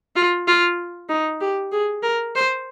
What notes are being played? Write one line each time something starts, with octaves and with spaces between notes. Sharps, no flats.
F4
F4
D#4
G4
G#4
A#4
C5